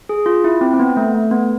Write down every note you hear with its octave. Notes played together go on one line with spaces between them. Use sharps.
G#4
F4
E4
C4
C4
B3
A3
A3
B3